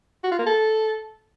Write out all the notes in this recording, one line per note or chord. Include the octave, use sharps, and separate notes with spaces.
F#4
F4
A#3
A4